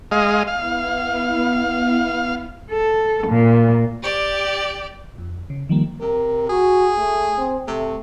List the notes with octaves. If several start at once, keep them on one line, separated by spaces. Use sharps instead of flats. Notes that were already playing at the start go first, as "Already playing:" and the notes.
G#3 D#5 F5
B3 E4 F5
A4
A#2
G4 D5
F2
C#3
D#3 F3 G3 A#3
C3 A#4
F#4 G#4
A3
C4
C3 A3